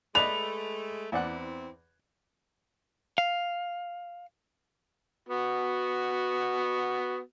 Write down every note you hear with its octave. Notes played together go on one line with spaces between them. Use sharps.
G#3 A3 B4 D5 D#5 F7
E2 C4 E4 D5 F#5
F5
B3 F#4